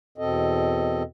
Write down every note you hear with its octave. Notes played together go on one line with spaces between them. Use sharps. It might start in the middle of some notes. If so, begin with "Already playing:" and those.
E2 B2 C4 A4 D#5